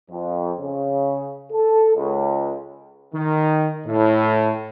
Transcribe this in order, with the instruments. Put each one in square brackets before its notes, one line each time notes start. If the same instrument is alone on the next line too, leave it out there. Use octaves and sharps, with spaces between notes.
[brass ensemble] F2
C#3
A4
C#2
D#3
A2